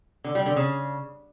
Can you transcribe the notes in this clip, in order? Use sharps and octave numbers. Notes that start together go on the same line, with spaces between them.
D3
G3
D3
C#3